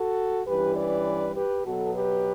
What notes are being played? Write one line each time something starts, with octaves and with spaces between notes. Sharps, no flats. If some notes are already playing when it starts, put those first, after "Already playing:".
Already playing: F#4 A4
G2 E3 G3 C#4 G4 B4
B4 D5
G4 B4
B2 F#3 B3 F#4 A4
G4 B4